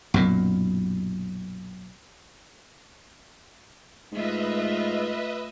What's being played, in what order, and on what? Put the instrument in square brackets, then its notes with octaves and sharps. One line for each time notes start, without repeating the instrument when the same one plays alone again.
[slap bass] B1 F#2 A#2
[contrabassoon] G#2 [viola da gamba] A3 F4 [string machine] B4 D#5 E5